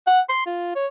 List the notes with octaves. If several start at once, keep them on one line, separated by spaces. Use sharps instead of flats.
F#5
C6
F4
C#5